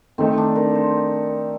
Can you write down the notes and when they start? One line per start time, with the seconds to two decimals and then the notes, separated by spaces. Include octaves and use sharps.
0.18 D#3 A3 C4 D#4
0.38 D4
0.56 A#4
0.75 C5